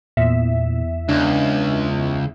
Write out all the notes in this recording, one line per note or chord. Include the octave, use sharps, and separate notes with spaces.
E2 A#2 E5
C#2 D4